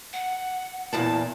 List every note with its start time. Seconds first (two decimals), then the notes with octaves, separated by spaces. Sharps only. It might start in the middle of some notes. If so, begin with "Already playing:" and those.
0.13 F#5
0.93 E2 A#2 E4 A5